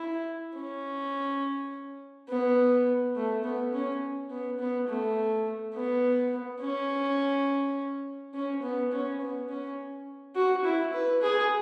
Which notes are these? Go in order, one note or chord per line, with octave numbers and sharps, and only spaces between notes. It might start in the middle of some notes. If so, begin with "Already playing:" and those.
Already playing: E4
C#4
B3
A3
B3
C#4
B3
B3
A3
B3
C#4
C#4
B3
C#4
B3
C#4
F#4
E4
B4
G#4